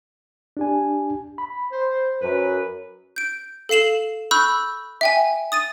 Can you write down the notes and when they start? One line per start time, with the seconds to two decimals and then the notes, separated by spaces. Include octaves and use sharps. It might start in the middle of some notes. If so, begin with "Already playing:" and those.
0.57 D4 G4 G#5
1.38 B5
1.72 C5
2.22 F#2 B4
3.16 G6 D7
3.69 A4 F5 C7 E7 F#7
4.31 B5 C#6 E6 F#6 G6
5.01 E5 G5 G#5
5.52 D#6 A6 D#7